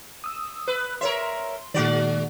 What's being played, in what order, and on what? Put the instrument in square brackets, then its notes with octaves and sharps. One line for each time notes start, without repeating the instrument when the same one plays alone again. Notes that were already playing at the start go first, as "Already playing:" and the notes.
[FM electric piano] D#6 E6
[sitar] B4
[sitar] A#4 C#5 E5 [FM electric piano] C6
[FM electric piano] A#2 D#3 [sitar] G#3 F#4 D5